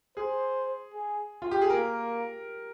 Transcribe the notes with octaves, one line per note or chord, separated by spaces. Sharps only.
G#4 C5
G#4
F4
G4
G#4
A#3 A#4